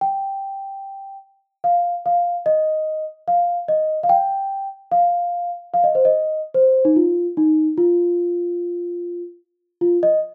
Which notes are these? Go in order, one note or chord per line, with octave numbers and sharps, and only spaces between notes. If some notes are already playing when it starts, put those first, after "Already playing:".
G5
F5
F5
D#5
F5
D#5
F5
G5
F5
F5
D#5
C5
D#5
C5
D#4
F4
D#4
F4
F4
D#5